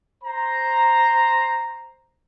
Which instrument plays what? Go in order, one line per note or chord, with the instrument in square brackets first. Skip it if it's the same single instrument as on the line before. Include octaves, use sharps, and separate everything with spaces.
[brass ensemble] C5 A#5